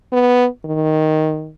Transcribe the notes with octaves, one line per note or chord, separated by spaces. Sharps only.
B3
D#3